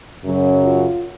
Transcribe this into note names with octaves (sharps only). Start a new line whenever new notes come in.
F#2 C#3 F#3
F4